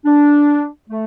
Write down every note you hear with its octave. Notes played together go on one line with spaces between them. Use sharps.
D4
A3